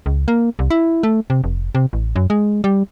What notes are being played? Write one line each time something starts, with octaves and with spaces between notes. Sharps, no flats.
C#2
A#3
C2
E4
A3
C3
F1
C3
A1
F#2
G#3
G3